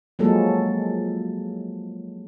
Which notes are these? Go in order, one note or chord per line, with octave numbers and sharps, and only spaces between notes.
F3 F#3 G#3 A#3 A4